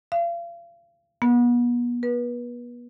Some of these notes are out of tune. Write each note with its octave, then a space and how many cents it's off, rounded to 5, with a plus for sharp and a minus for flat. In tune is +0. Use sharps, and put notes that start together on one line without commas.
F5 -35
B3 -35
B4 -30